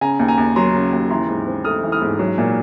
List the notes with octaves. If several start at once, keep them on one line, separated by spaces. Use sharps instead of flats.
C#3 G#5 A#5
D#2
G#5 A#5
D#2
F#3 A#5 C6
C#3
D#2
E3 A#5 C6
G#2
C4
A3 D#6 F6
E3
D#6 F6
G#2
F#3
A#2